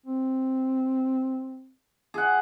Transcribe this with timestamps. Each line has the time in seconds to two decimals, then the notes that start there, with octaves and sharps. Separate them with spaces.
0.06 C4
2.14 G#4 F#5